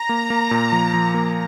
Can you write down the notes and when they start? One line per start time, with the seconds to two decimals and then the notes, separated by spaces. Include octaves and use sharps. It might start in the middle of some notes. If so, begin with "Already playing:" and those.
Already playing: A#5
0.09 A#3
0.30 A#3
0.51 A#2
0.72 F3
0.93 F3
1.14 A#3